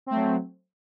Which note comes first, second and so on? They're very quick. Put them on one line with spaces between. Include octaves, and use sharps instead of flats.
C4 A3 F#3